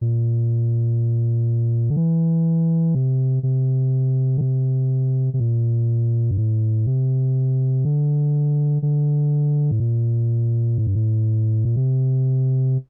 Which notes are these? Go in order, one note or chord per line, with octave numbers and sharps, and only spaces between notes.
A#2
D3
E3
C3
C3
D3
C3
C3
A#2
G2
A2
C3
D3
D3
A2
A#2
A2
G2
A2
A#2
C3